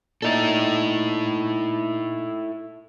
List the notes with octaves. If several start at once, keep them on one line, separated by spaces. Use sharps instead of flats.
A#2 D#4 E4 A4 A6